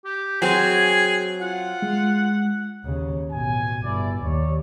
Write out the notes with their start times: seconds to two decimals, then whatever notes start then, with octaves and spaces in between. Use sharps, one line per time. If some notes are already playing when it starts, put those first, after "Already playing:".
0.05 G4
0.42 F#3 C4 G#4 G#5
1.41 F4 F#5
1.82 G#3
2.84 D#2 C#3
3.31 A1 B2 G#5
3.82 G1 E4 D5
4.23 D#2 C#5 D5